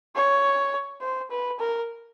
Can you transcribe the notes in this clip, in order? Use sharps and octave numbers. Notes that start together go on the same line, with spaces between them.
C#5
C5
B4
A#4